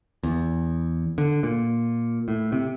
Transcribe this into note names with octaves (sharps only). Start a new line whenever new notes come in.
E2
D3
A#2
A2
C3